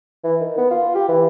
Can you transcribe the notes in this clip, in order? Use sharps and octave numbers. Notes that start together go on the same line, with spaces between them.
E3
D#3
B3
F4
G4
E3